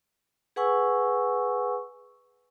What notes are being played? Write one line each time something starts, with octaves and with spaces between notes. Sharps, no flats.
G#4 B4 F#5 G#5 C#6 E6